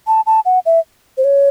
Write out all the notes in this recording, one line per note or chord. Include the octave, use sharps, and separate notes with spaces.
A5
A5
F#5
E5
C5
C#5